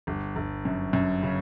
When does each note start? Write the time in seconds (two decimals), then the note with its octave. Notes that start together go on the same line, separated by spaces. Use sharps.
0.07 G1
0.36 G1
0.65 F#2
0.93 F#2
1.23 C#3